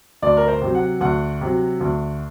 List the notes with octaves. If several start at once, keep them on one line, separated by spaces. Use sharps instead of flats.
D2 D5
A#4
C5
C3 F#3
F#5
D2 F#5
C3 F#3
D2